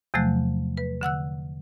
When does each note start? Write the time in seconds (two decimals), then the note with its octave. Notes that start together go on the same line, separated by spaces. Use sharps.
0.14 E2 C3 F3 F#3 A3 F#6
0.77 B4
1.01 D3 F#5 E6 F#6